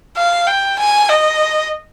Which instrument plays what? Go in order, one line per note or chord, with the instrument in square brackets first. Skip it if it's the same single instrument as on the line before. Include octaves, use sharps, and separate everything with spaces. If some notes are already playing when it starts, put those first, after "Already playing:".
[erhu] F5
G5
G#5
D#5